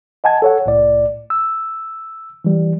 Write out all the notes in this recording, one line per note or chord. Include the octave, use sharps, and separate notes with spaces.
D#5 F#5 G#5 A5 G#6
A4 C#5 F#5
C2 A2 D5
E6
E3 G3